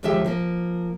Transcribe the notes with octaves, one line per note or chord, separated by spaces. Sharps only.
D#2 D3 F3 G#3 G4 E5
F3 A#3